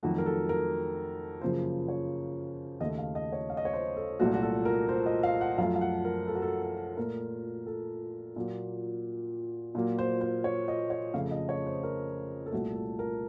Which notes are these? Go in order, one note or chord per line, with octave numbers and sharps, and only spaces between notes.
F2 D#3 F#3 A3 F#4
A#4
A4
A#4
F#2 C#3 F3 A#3 C5
C#5
D#2 C#3 A3 D#5
F5
D#5
C#5
F5
D#5
C#5
C5
A4
C2 A#2 F#3 A3 F#4
F#4
A4
A#4
C5
D#5
F5
F#5
F#2 F3 A3 F5
F5
F#5
A#4
A4
F#4
A4
A4
A#2 A3 A#4
A4
A#2 F#3 A#3
A#2 F#3 A#3
C5
C5
C#5
D#5
C#5
F2 C#3 A3 F5
D#5
C#5
C5
A#4
A4
C2 A#2 A3 F#4
A4
A#4